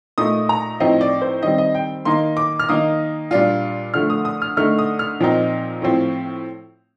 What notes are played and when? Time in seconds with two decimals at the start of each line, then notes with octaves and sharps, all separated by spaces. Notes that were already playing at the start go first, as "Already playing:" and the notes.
0.18 A#2 A3 D#4 D#6
0.49 A#5
0.80 A2 F3 C4 D#4 D#5
1.01 D5
1.22 C5
1.43 D#3 G3 C4 D#5
1.58 D#5
1.75 G5
2.05 D#3 A#3 D#4 C6
2.37 D6
2.59 F6
2.69 D#3 A#3 D#4 D#6
3.31 A#2 G3 D4 F4
3.94 D3 F3 A3 F6
4.10 D#6
4.25 D#6
4.42 F6
4.57 D3 A3 D#4 F6
4.79 D#6
4.99 F6
5.20 A#2 F3 C4 D#4
5.82 A2 F3 C4